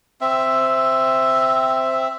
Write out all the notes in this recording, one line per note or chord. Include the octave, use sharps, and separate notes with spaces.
C4 E5